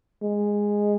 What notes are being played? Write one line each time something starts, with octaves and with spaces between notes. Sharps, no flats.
G#3